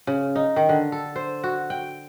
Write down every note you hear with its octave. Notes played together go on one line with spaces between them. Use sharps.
C#3
D#4
D#3
D3
A4
C5
F#4
G5